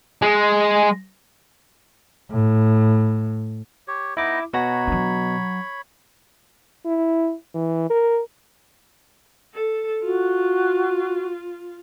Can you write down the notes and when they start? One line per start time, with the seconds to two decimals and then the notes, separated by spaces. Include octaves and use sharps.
0.22 G#3
2.31 A2
3.88 G4 C#5
4.17 B3 D#4 E4 D#5 D6
4.53 B2 F#4 C#5 A#5 B5
4.87 F#3 D4
6.85 E4
7.55 E3
7.90 A#4
9.54 A4
10.03 F4 F#4